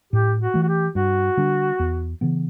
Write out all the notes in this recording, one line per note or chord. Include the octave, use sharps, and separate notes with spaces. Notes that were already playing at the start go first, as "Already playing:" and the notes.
A2 G4
F#4
E3 A3
F#4
G4
G2 F#4
D3 G3 D4
E2
C#3 E3 B3